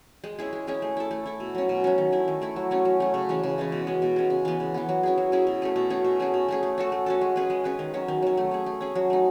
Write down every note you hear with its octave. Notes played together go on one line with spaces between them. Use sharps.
G#3
C#4 E4 G#4
G#3
C#4 E4 G#4
A3
E4 A4
A3
E4 A4
B2
F#3 C#4
B2
F#3 C#4
D#3
A3 E4
D#3
A3 E4
F#3
A3 C#4
F#3
A3 C#4
C#3
E3 G#3 C#4
C#3
E3 G#3 C#4
B2
G#3 C#4
B2
G#3 C#4
C#3
E3 B3
C#3
E3 B3
F#3
C#4 E4 G#4
F#3
C#4 E4 G#4
B2
A3 C#4 G#4
B2
A3 C#4 G#4
B2
A3 C#4 G#4
B2
A3 C#4 G#4
A3
C#4 F#4 A4
A3
C#4 F#4 A4
G#3
C#4 G#4 B4
G#3
C#4 G#4 B4
D#3
F#3 C#4
D#3
F#3 C#4
A3
C#4 G#4
A3
C#4 G#4
F#3
A3 D#4